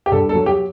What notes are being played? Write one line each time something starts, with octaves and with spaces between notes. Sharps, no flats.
G4
G2 A4
A4
F#3
G4